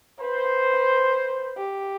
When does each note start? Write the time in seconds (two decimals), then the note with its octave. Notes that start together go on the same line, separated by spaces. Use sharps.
0.20 B4 C5
1.57 G4